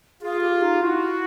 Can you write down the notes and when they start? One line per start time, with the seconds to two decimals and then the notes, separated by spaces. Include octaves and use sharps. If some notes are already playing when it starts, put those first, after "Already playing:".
0.22 F4 G#4
0.41 G4
0.61 D#4
0.82 E4 F#4